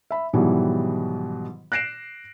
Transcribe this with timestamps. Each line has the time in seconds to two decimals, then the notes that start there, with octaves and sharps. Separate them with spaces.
0.11 E5 B5
0.33 G#2 B2 D#3 E3 F#3 G3
1.72 F#6 A#6 C7 D7 E7